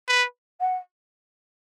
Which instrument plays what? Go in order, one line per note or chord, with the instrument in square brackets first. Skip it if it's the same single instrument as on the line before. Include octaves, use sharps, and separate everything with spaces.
[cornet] B4
[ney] F#5